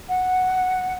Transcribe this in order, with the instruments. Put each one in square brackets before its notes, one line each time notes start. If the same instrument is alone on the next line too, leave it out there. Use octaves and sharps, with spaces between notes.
[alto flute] F#5